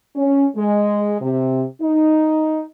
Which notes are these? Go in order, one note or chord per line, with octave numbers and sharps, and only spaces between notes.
C#4
G#3
C3
D#4